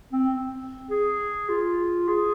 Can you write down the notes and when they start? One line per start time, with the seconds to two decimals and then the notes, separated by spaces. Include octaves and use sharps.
0.12 C4
0.90 G#4
1.49 F4
2.08 G#4